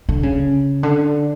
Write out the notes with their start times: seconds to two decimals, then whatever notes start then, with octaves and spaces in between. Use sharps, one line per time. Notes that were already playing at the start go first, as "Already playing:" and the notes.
0.09 D3
0.23 C#3
0.83 D3